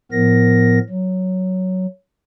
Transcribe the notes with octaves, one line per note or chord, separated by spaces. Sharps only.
A2 F3 B3 A#4 A#6
F#3